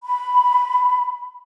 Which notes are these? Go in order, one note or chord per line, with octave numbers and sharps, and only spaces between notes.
B5